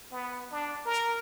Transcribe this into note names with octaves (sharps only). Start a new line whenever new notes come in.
B3
D4
A#4